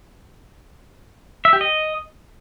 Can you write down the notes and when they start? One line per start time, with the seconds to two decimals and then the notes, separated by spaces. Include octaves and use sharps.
1.45 E5
1.53 G4
1.61 D#5